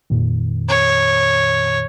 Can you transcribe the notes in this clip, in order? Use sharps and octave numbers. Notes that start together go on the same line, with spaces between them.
F2 A#2 D#3
C#5